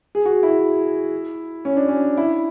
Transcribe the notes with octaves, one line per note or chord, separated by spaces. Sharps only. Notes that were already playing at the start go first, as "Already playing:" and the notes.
G#4
F#4
E4
C#4
D4
C#4
E4